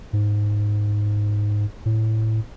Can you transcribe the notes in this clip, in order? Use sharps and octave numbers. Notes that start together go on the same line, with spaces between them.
G#2
A2